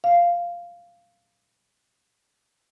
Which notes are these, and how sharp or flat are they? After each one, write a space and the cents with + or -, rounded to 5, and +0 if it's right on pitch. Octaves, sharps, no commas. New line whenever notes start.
F5 -5